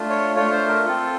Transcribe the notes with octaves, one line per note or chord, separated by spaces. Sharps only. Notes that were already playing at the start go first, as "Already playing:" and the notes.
Already playing: A3 D4 F4
C#5
A3 D4 F4 C#5
C5
A#4
C4 F4 A4